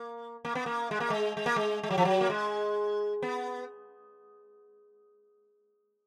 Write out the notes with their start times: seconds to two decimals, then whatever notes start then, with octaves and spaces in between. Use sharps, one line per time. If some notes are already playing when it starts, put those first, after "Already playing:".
Already playing: A#3
0.45 A#3
0.55 B3
0.66 A#3
0.91 G#3
1.00 A#3
1.10 G#3
1.37 G#3
1.46 A#3
1.56 G#3
1.83 G#3
1.90 F#3
1.98 F3
2.05 F#3
2.21 A#3
2.30 G#3
3.22 B3